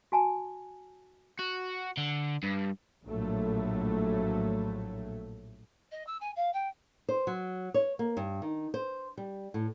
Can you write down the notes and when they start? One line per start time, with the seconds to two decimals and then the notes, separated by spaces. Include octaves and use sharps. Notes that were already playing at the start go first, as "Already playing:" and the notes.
0.12 F#4 G#5 A5
1.39 F#4
1.97 D3
2.43 G2
3.05 A#1 A2 F#3 A3
5.91 D#5
6.06 E6
6.20 G#5
6.36 F5
6.53 G5
7.09 C5
7.27 F#3
7.74 C#5
7.99 A#3
8.17 G2
8.42 D#3
8.74 C5
9.18 G3
9.54 A2